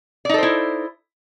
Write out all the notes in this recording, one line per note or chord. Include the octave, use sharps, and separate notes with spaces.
D#4 E4 A4 C5 D5